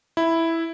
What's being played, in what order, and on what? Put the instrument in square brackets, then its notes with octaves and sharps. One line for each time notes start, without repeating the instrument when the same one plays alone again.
[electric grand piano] E4